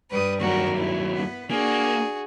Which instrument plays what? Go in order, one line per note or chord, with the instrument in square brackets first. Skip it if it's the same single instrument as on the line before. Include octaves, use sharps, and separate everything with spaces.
[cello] G2 G3 [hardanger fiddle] B4 D#6
[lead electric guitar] D#2 F#3 [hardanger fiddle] F#4 A#4
[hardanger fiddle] E4
[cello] B3 B4
[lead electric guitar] A#3 [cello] D4 [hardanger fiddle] F#4 G#4